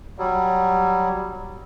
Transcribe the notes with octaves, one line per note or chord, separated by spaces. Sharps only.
F#3 G3